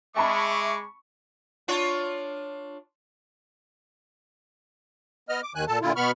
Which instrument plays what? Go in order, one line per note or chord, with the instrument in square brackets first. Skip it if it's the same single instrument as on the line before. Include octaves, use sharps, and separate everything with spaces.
[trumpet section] G#3 D6 [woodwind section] E5 [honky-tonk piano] A5 B5 [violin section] C#6
[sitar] D4 F4 C#5
[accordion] B3 D#5 F6
D6
D#2 D#3 G#5 F#6
A#2 A4 A5
A#2 D3 E4 F4
B2 B3 B5 C#6 F6